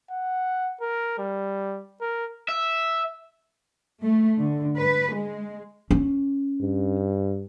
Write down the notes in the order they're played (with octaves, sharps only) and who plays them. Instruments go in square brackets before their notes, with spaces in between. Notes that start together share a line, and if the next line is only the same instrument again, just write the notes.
[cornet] F#5
A#4
G3
A#4
[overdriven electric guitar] E5
[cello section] A3
D3
B4
G#3
[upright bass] C#4
[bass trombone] G2